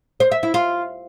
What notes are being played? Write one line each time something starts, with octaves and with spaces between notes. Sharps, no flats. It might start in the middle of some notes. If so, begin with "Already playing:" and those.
C5
E5
E4
F4